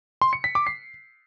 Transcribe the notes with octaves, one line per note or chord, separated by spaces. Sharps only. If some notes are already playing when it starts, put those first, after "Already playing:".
C6
C#7
B6
D6
C7